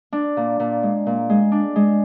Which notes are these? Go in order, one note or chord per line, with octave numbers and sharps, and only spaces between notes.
D4
A#2
A#2
G#3
A#2
G#3
D4
G#3